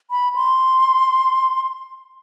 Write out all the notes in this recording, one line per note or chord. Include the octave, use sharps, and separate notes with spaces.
B5
C6